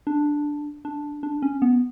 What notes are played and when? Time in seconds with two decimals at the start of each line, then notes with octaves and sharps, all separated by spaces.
0.07 D4
0.85 D4
1.23 D4
1.43 C#4
1.62 B3